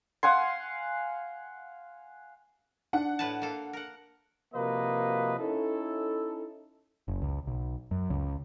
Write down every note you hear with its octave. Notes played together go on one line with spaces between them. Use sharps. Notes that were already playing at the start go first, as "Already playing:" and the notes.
F5 F#5 G#5 C6
D4 F#5
A2 B4 A5
A#3 A4
A#4 F#5
C3 F3 A#3 F#4 B4 D#5
C#4 D#4 E4 A4
F#1
C#2
B1
F#2
C#2